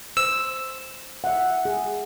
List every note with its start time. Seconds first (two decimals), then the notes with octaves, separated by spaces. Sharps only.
0.17 C5 E6
1.24 E5 F#5
1.65 G#4